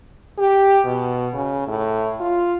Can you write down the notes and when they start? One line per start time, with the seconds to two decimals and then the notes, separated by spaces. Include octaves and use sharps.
0.38 G4
0.85 B2
1.34 C#3
1.68 A2
2.20 F4